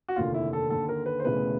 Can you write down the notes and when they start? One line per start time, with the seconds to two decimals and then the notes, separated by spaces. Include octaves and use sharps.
0.08 F#4
0.16 F1 D#2 D3 F4
0.34 E4
0.53 A4
0.70 D#2 D3 A4
0.89 A#4
1.06 B4
1.20 C5
1.24 E1 D2 C#3 E3 B4